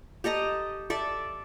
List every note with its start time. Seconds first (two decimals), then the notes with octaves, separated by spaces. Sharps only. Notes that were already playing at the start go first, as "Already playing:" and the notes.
0.24 G4 A4 D#5 A#5
0.90 A4 D5 E5